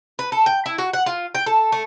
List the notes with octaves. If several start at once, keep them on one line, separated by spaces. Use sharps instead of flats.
B4
A4
G5
E4
F#4
F#5
F4
G5
A4
A3